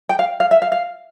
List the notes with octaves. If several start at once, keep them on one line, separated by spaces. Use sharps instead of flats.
G5
F5
F5
E5
F5
F5